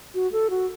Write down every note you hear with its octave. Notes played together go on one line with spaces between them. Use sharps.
F#4
A4
F#4